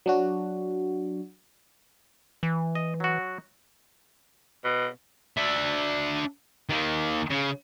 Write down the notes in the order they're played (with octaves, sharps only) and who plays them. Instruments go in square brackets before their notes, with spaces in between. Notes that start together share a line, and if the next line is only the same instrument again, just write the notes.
[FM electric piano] F#3 D4 F#4
[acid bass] E3
[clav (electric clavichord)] D#5
F#3 F#4
[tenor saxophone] B2
[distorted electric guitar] D4 E5
D#3 A#3
C#3